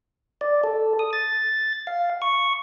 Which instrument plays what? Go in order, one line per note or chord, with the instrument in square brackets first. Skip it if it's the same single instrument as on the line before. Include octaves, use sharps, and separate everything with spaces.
[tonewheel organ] D5
A4
D#6
A6
F5
C#6